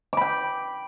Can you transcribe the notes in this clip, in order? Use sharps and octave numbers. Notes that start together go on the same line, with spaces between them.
G5 B5 D6